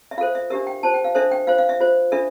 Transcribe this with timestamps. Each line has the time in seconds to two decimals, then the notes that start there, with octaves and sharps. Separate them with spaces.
0.11 E5
0.18 F4 A4 C5 F5
0.35 E5
0.50 D4 G4 A#4 E5
0.67 G5
0.83 F4 C5 A5
0.94 G5
1.04 F5
1.15 D4 A4 C5 E5
1.32 G5
1.47 F4 C5 F5
1.58 F5
1.69 E5
1.80 F4 C5
2.12 D4 F4 A4 E5